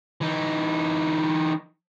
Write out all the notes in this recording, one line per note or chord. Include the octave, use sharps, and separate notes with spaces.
E3 D#4